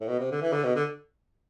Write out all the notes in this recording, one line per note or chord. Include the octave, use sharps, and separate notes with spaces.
A2
B2
C3
D3
E3
D3
B2
D3